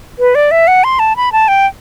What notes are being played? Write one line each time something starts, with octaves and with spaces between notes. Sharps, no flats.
B4
D5
E5
F#5
C6
A5
B5
A5
G5